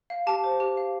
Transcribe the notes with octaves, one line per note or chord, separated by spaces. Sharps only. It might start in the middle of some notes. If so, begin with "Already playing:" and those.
F5
G4 A5
C5
G4
F5